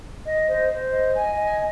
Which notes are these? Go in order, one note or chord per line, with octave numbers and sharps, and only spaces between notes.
D#5
C5
C5
D#5
G#5
D#5